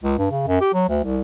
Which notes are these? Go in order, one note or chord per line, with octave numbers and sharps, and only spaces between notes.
C#2
G2
C#3
F#2
G4
F#3
D2
C2